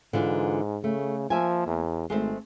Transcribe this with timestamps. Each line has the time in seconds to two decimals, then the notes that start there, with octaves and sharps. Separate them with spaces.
0.13 G#2 D3 E3 F4
0.84 C#3 A3
1.30 F3 A#3 E5 G#5
1.66 E2
2.10 G#1 G#3 A3 C4